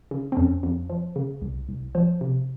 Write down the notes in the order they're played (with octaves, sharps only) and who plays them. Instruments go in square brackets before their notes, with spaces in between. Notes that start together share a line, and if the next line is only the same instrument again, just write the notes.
[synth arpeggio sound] C#3
C4
F2 C#4
F2
F3
C#3
C2
C2
F3 C5
C3